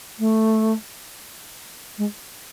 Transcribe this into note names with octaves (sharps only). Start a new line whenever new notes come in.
A3
G#3